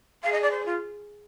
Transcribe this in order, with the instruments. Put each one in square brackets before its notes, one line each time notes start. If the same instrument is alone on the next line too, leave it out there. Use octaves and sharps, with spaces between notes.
[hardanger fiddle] G#4 [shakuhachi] F5
[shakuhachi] D#5
D5
C5
F4